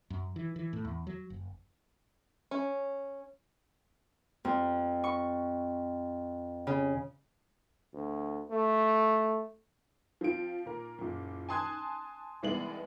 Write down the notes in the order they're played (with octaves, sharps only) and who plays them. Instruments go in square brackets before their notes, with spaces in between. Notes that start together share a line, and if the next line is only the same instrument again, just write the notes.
[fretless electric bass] F#2
E3
E3
A2
E2
F#3
F#1
[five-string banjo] C#4
[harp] F2
C#6
C#3
[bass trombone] D2
A3
[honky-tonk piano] F3 C4 F4 D7
A#2 A#4
F#1 A#2
G#5 A5 C6 D#6 F#6 G#6
C2 E3 G#3 B3 D5 F#7